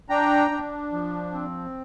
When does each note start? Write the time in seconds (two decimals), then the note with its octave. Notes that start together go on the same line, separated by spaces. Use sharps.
0.09 D4 G5 A#5
0.51 D4
0.92 F3
1.33 C4